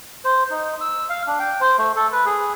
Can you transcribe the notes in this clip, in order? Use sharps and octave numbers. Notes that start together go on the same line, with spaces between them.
C5
D#4
E6
F5
D4
G5
C5
A3
A4
B4
G#4